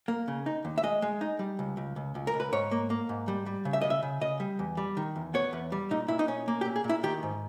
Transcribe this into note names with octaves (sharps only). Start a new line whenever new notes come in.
A#3
C#3
D#4
D#2
E5
G#3 D#5
G#3
D#4
G3
C#2
C#2
C#2
C#2
A#4
C#2
B4
G#2 C#5
A#3
A#3
G#2
G3
G3
C#3
E5
C#3 D#5
E5
C#3
C#3 D#5
G3
E2
G3
D#3
E2
B3 C#5
E2
G3
A#2 D#4
A#2 E4
D#4
C#4
A#3
G4
A#2
G#4
A#2
E4
D#3 G4
G#2